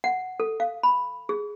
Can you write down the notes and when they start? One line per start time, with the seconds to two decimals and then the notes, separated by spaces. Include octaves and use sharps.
0.04 F#5
0.40 A4
0.60 F5
0.83 B5
1.29 G#4